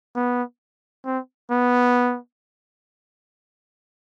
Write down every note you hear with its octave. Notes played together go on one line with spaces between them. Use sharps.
B3
C4
B3